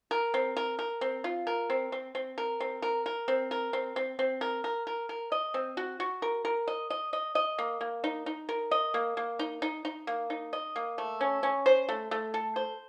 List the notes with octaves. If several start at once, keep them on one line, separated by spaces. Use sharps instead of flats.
A#4
C4
A#4
A#4
C4
F4
A#4
C4
C4
C4
A#4
C4
A#4
A#4
C4
A#4
C4
C4
C4
A#4
A#4
A#4
A#4
D#5
C4
F#4
F#4
A#4
A#4
D#5
D#5
D#5
D#5
A#3
A#3
D#4
D#4
A#4
D#5
A#3
A#3
D#4
D#4
D#4
A#3
D#4
D#5
A#3
A3
C#4
C#4
C5
A3
A3
A4
C5